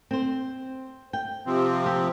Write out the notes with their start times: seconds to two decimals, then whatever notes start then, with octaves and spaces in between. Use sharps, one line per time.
0.11 C4 C5
1.13 G5
1.47 C3 F3 C4
1.86 G4